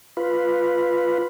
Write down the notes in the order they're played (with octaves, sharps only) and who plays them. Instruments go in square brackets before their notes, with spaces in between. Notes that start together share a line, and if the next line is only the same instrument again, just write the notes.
[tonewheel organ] F4 B4